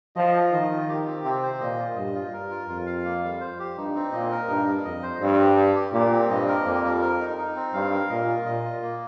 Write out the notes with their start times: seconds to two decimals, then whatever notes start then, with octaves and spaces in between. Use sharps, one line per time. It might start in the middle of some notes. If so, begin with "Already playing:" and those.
0.16 F3 D#5
0.33 F4
0.52 D#3 D#5
0.70 F4
0.89 G4
1.06 C4
1.24 C3 C4
1.43 C5
1.61 A#2 D#5
1.78 F4
1.96 G2 D#5
2.14 F4
2.33 G2 A#4
2.51 F4
2.68 F2 F4
2.86 F5
3.04 A#3
3.23 G3
3.41 C5
3.59 G4
3.77 G2 D#4
3.95 C4
4.12 A#2 D#5
4.31 A#4
4.48 G2 D#4
4.66 G3
4.84 F2 D#5
5.03 C5
5.21 G2 C4
5.39 G3
5.57 G3
5.76 G4
5.93 A#2 G4
6.12 C4
6.30 G2 D#5
6.48 A#4
6.65 F2 A#3
6.84 G3
7.01 A#4
7.20 D#4
7.38 D#4
7.56 C4
7.73 G2 F5
7.92 A#4
8.10 A#2 D#5
8.28 F4
8.46 A#2 D#5
8.65 F4
8.82 A#3